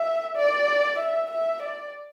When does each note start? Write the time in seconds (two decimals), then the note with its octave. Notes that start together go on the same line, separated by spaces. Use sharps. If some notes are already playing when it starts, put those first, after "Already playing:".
Already playing: E5
0.36 D5
0.99 E5
1.31 E5
1.62 D5